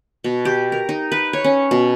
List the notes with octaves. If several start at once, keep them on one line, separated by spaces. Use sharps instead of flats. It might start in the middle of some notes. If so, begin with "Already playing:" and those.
B2
G4
A#4
D#4
B4
C#5
C#4
B2